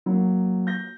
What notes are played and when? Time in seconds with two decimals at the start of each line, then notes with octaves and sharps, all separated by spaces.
0.06 F#3 A#3
0.67 G6 A#6